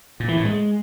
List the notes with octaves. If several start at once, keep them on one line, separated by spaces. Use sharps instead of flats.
A#2
E3
A2
G#3